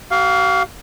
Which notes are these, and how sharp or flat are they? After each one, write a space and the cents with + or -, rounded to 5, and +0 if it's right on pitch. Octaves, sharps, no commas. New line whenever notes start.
F#4 +45 F5 +5